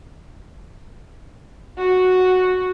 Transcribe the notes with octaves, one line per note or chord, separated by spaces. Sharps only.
F#4